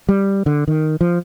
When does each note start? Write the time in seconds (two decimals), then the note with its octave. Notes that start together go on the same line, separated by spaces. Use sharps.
0.09 G3
0.46 D3
0.68 D#3
1.01 F3